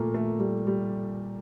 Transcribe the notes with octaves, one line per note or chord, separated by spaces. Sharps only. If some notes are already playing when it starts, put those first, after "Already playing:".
Already playing: A#2 A3 A#3
A3
G3
G3